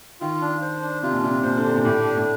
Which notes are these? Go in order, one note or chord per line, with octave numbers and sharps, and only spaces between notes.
D#3 F4
D4
C5
D4
C3 F4
A#2
C3 D4
A#2 C5
D3
C3 D4
A#2
A2 G4
D4
A2